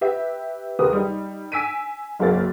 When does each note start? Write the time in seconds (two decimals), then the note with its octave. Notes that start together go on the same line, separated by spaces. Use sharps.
0.01 G4 B4 E5
0.79 D#2 C3 G#4 A#4 B4 D#6
0.93 G3 D#4
1.52 G#5 E6 B6 D7 D#7
2.19 F#1 B1 F#2 A#3 C4 A6